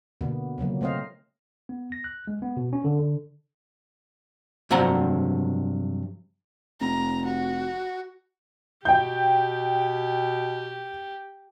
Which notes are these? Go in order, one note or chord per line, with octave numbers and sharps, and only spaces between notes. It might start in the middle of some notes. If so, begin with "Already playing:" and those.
B2 D3 A#3 B3
C#3 F3 F#3 A#3
A3 C4 C5 D#5 F5
B3
A#6
F#6
G#3
B3
B2
C#4
D3
D3
G2 C3 F3 F#3 F#5 A#5
F1 A#5
F#4
B2 G4 G5 G6